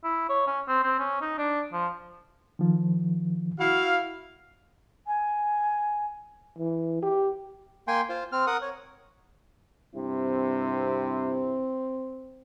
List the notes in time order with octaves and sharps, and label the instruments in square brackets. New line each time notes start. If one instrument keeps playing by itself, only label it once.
[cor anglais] E4
C#5
C#4
C4
C4
C#4
D#4
D4
F3
[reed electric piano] D#3 F3
[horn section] E4 F#4 F5
[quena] G#5
[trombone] E3
G4
[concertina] A#3 G5 G#5 C6
F4 C5
C4 F6
A#4 F#5 D#6
C#5
[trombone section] G2 C3 E4 [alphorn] C4